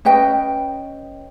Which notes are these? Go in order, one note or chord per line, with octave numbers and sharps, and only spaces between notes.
C#4 B4 D#5 G5